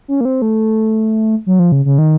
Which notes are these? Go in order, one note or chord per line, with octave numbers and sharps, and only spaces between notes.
C#4
A#3
C4
A3
F#3
F3
C#3
C#3
D#3